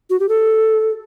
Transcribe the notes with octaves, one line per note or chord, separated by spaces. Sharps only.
F#4
G4
A4